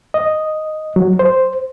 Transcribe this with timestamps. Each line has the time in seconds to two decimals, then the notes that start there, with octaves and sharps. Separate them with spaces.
0.14 D#5
0.96 F#3
1.19 C5